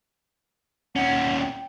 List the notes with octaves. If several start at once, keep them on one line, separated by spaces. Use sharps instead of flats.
D#2 C#4 F#5
G5